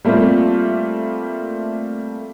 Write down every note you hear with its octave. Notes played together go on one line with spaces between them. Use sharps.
G3 A3 A#3 C4 F4